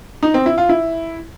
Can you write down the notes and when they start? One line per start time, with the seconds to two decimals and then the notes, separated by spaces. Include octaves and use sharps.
0.23 D#4
0.34 C4
0.46 E4
0.58 F4
0.69 E4